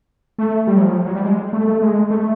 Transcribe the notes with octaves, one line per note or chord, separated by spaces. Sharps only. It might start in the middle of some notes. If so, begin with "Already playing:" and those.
A3
G3
F#3
F3
F#3
G3
G#3
A3
A3
G#3
A3